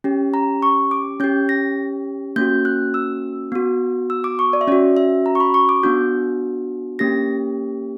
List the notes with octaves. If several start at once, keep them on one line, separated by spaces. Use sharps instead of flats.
C#4 G4
A#5
C#6
D6
C#4 G4 G6
A#6
A#3 C#4 F#4 G6
F#6
E6
B3 F#4
E6
D6
C#6
D5
E5
C#4 F#4 D5
E5
A#5
C#6
B5
C#6
D6
B3 D4 F#4 G6
A#3 C#4 G4 A#6